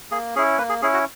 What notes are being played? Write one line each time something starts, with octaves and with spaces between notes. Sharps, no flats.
A#3 G#4
C#4 E4 G#4
A#3 B4
G#4
C#4 E4 G#4
F#4